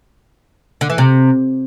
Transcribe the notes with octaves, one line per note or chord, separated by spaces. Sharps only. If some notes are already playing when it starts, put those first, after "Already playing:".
D3
E3
C3